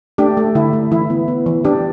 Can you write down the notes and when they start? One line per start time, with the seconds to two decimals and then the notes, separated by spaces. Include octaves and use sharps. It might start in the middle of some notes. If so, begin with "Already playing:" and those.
0.18 A3 D4 G4
0.37 A3
0.55 D3 E4
0.73 A3
0.91 E3 E4
1.10 B3
1.28 B3
1.46 E3
1.65 E3 D4 G4